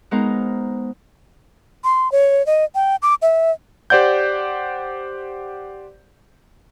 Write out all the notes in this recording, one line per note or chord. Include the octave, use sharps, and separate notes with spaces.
G#3 B3 D#4 A#4 C5
C6
C#5
D#5
G5
D6
E5
G4 C5 D5 F#5 G6